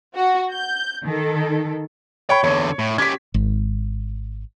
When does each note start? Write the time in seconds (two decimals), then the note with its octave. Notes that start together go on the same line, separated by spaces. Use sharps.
0.15 F#4
0.53 G6
1.04 D#3 A4
2.30 C#5 G5 B5
2.44 E2 D3 C#5
2.79 A2
2.98 C#4 G4 G#6 B6
3.34 G#1